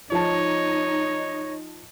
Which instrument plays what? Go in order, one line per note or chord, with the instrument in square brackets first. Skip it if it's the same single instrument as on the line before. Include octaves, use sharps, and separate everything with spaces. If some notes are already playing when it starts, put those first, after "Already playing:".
[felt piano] F3 A5 [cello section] D#4 [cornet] C#5